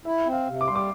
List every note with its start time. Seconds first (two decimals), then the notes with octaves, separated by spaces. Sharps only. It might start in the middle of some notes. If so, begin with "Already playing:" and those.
0.05 E4 E5
0.26 C4
0.33 F5
0.47 C3
0.61 D6
0.68 G3 C6
0.75 D6